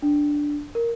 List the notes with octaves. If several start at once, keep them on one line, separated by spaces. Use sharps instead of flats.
D4
A#4